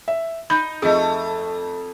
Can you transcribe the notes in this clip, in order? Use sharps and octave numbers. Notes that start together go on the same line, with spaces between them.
E5
D#4 B5 G6
F2 A3 G#4 D#5